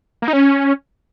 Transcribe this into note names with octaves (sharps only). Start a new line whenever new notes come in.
A#3
D#4
C#4